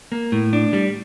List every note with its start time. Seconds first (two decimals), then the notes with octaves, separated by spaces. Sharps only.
0.12 A#3
0.32 A2
0.53 D4
0.73 G3